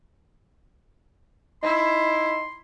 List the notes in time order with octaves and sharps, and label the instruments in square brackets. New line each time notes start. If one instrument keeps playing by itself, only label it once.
[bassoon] D#4 [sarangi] E4 [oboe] C6